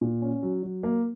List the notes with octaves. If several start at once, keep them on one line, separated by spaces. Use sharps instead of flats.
A#2
C#4
F#3
F#3
A#3